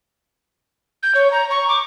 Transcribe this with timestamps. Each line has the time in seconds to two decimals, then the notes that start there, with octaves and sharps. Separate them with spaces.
1.03 G6
1.15 C#5
1.31 A#5
1.50 C#6
1.68 D6